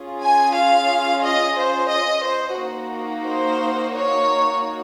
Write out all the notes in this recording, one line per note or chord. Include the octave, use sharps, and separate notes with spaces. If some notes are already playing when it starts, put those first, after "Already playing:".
Already playing: C#4 F4 G#4
G#5
F5
D#5
C5
D#5
C5
A#3 D#4 F#4
C5
C#5